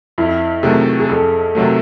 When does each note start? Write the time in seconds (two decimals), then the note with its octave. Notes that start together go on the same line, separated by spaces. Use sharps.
0.18 F2 E4
0.63 C3 D#3 F#3 A3 G#4
1.00 G#4
1.09 F2 A4
1.55 C3 D#3 F#3 A3